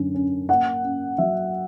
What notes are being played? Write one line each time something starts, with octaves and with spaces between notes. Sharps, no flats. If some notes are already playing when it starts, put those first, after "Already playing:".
Already playing: F#2 D3 C#4
C#4
A#3 F#5
C#4
F#3 E5